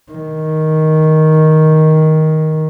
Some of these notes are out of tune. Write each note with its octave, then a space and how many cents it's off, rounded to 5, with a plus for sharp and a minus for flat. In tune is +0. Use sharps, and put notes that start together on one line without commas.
D#3 +10